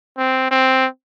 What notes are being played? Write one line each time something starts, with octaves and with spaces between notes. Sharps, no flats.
C4
C4